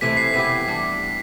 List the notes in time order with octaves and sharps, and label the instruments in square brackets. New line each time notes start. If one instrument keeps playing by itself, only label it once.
[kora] C3 E3 A3 E4 [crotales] B6
[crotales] C7
[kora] E3 B3 E4 G4 [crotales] B6
[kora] G3 D4